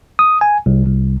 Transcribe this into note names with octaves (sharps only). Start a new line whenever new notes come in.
D#6
G#5
C2
C2